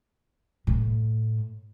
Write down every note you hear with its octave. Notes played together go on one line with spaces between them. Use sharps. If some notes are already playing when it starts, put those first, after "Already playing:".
A2